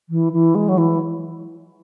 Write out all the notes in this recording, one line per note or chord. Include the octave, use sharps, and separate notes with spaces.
E3
E3
G#3
F#3
E3